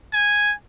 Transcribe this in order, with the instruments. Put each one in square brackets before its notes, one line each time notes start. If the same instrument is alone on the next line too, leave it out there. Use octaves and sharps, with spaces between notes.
[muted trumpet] G#5